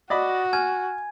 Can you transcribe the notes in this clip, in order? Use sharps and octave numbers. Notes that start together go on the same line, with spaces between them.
F#4 D5 D#5 B5
G#5 F6 G#6